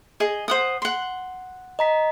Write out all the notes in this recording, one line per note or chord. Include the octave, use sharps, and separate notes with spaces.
G#4 D#5
C5 F#5 D#6
F#5 C6
D#5 A#5 B6